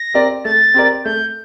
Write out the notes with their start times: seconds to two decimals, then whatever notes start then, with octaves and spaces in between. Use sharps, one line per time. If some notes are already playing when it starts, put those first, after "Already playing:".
Already playing: A#6
0.14 C4 G4 A#4 D5
0.45 A3 A6
0.74 C4 G4 A#4 D5
1.05 A3 G6